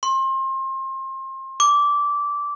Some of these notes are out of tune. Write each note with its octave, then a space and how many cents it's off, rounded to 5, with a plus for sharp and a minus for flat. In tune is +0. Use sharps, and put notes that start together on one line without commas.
C6 +30
D6 -15